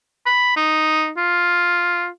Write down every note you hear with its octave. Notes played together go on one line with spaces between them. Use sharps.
B5
D#4
F4